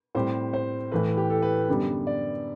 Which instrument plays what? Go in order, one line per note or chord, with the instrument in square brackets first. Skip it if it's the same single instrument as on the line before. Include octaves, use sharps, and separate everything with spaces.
[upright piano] A2 G3 C4 G4 [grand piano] C5
[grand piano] C5
[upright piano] A2 E3 A3 [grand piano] B4
[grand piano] B4
G4
A4
B4
[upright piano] F#2 D3 G3 B3
[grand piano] D5